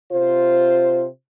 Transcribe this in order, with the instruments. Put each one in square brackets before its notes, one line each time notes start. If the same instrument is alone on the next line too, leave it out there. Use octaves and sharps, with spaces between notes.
[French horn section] C3 F4 C5